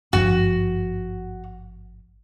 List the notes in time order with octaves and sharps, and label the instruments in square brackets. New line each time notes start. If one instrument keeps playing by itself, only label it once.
[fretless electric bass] G#1 G2 F3 [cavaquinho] F#4